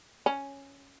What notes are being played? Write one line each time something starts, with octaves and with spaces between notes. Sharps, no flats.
C#4